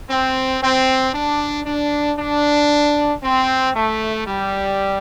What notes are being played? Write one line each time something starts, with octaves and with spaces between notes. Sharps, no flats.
C4
C4
D4
D4
D4
C4
A3
G3